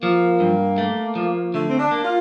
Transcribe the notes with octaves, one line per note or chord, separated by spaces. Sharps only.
F3 A#3
G2
A3
F3
D3 A3
C4
D4
A#3
F4